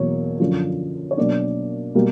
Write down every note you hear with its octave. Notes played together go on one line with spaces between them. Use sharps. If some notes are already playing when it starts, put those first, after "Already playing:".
Already playing: E2 B2 F#3 A#3 C#5
F#2 D3 F3
C#5
B2 F#3 A#3 D4 D5
B2 G3 A#3